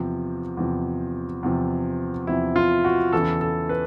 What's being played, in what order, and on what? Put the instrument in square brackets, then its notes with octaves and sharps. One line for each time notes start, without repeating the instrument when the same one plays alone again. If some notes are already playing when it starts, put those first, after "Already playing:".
Already playing: [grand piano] E2 C3 F3
E2 C3 F3
E2 C3 F3
E2 C3 F3 E4
F4
F#4
E2 C#3 E3 A4
A4
B4